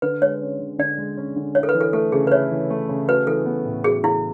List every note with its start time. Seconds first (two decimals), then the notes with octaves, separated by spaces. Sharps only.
0.02 D3 B4
0.22 G#3 C#5
0.41 C#4
0.60 D3
0.79 D3 D5
0.98 G#3
1.17 C#4
1.36 D3
1.55 E4 C#5
1.63 A4
1.69 B4
1.75 E3
1.81 A4
1.93 A3 A4
2.12 C#3 G#4
2.27 B4
2.31 E4 C#5
2.51 E3
2.70 A3
2.89 C#3
3.08 F#4 B4
3.27 E3 A4
3.46 B3
3.65 A2
3.84 F#4 G#4
4.03 E3 E4